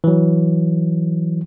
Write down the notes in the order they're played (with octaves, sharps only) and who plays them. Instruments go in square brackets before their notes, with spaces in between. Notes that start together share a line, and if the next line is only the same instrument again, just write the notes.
[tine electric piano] E3 F#3